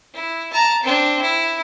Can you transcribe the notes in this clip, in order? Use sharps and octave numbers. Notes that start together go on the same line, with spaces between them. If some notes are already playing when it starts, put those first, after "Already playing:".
E4
A5 A#5
C4 D4
E4